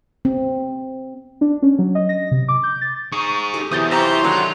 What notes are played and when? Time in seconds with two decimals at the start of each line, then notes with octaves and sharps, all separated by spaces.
0.25 C4
1.41 D4
1.62 C#4
1.79 F#3
1.95 D#5
2.09 A#6
2.31 C3
2.48 D6
2.63 G6
2.81 A6
3.12 D#4 G#4 C#6
3.54 G4 A4
3.71 E2 C3 E3 F#3 D#6 G6 A6
3.91 E4 F4 G4 C5 A#5 C#6
4.23 D3 D#3 F#3 D#4 E4